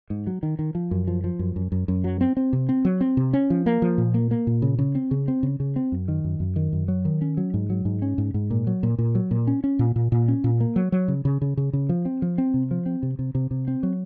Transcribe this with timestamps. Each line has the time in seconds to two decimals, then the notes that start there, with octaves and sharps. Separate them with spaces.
0.10 G#2
0.27 F#3
0.43 D#3
0.59 D#3
0.75 F3
0.91 F#2
1.08 F3
1.24 F3
1.39 F#2
1.56 F#2
1.72 F#2
1.88 F#2
2.04 F#3
2.21 C4
2.37 C4
2.53 C3
2.69 C4
2.85 F#3
3.01 C4
3.17 C3
3.33 C#4
3.50 F3
3.66 A#3
3.82 F3
3.98 A#2
4.14 A#3
4.31 A#3
4.47 A#2
4.62 C#3
4.79 C#3
4.95 C4
5.11 C#3
5.28 C4
5.43 C#3
5.60 C#3
5.76 C4
5.92 F#2
6.08 D#3
6.24 F#2
6.40 F#2
6.56 D#3
6.73 F#2
6.88 F#3
7.05 D#3
7.21 C#4
7.37 F#3
7.54 G#2
7.70 F#3
7.85 G#2
8.02 C#4
8.18 G#2
8.34 G#2
8.51 A#2
8.67 F#3
8.83 A#2
8.98 A#2
9.15 F#3
9.31 A#2
9.47 C#4
9.64 C#4
9.79 A#2
9.96 A#2
10.12 A#2
10.28 C#4
10.44 A#2
10.60 A#3
10.76 F#3
10.92 F#3
11.08 C#3
11.25 C#3
11.42 C#3
11.57 C#3
11.73 C#3
11.89 F3
12.05 C4
12.22 F3
12.38 C4
12.54 C3
12.71 F3
12.86 C4
13.03 C3
13.19 C3
13.35 C3
13.51 C3
13.68 C4
13.83 F#3